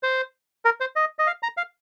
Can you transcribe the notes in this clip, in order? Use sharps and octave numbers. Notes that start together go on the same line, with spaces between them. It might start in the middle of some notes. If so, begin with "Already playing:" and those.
C5
A#4
C5
D#5
D#5
F5
A#5
F5